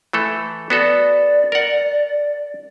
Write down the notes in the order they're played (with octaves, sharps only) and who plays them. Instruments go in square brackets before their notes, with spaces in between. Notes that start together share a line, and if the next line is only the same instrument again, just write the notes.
[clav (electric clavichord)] E3 A3 A4
[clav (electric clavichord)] B3 F#4 A4 [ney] D5
[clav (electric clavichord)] A#4 F#5